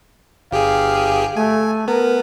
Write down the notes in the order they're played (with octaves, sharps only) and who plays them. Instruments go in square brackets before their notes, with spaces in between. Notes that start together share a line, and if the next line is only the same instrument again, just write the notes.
[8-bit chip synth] G1 G4 G#4 [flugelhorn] F5
[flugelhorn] A3 [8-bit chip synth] G#5
[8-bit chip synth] B3 [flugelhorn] A#4